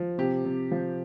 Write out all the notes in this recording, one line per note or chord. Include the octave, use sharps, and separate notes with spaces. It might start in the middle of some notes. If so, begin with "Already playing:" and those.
Already playing: F3
C3 G4
C3
F3